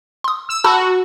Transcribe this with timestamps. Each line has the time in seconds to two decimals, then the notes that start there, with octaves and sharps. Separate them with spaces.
0.24 C6 D#6
0.49 E6
0.64 F#4 A5 B5 E6